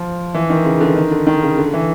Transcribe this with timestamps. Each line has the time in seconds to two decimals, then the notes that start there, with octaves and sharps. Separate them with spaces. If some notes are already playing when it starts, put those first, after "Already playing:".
Already playing: F3
0.34 E3
0.50 D#3
0.65 C#3
0.80 D3
0.96 D#3
1.11 D3
1.27 D#3
1.42 C#3
1.58 D3
1.73 E3